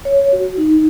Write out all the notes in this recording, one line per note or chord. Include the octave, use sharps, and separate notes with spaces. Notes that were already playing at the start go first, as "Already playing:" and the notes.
C#5
F#4
D#4